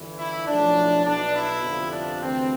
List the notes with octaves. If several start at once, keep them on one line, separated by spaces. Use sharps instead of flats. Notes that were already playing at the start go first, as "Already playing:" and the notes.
Already playing: G1 G2 E3
E4
B1 A2 F3 D4
B1 B2 D4
E4
G1 F2 C3 F3
D4
D2 C3 E3 C4